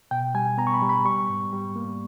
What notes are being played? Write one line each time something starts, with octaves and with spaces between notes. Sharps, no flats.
B2 G5
G3 G#5
B3 A#5
C#6
B5
G3
B5
G3 C#6
G#2
G3
A#3